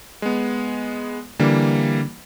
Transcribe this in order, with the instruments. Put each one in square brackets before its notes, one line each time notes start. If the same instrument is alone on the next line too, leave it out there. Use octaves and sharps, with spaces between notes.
[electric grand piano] G#3 B3
[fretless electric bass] D3 [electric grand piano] E3 G3 A#3